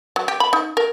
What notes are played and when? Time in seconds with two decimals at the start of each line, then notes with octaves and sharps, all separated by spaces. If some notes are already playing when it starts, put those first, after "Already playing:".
0.16 F#3
0.28 G4
0.40 B5
0.53 D#4
0.77 A#4